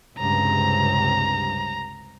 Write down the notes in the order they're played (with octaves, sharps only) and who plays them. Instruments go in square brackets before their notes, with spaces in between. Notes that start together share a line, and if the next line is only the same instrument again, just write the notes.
[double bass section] C#2 G2 C3 [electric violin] A#5